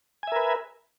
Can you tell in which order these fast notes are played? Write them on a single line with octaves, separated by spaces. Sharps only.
G#5 E5 A#4 B4